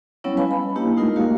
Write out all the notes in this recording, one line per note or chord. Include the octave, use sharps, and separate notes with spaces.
F#3 G3 B3 C#4 E4 C#5
B4 D#5 F5 G#5 A5 B5
B5
A#3 D4 E4 G4 B4 D#5
G#3 A3 D#4 F4 A#4 D#5
G3 A#3 F#4 G4 A#4 F5